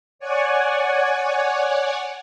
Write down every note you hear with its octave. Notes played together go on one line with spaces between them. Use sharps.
C#5 D5 F#5 G#5